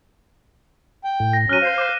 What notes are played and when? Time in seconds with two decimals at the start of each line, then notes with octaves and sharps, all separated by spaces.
1.05 G5
1.20 A2
1.33 A#6
1.49 F#3 C#4 F6 F#6 D#7
1.62 C5 F5
1.78 D6